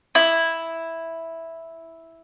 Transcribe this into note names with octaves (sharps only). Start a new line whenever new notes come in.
E4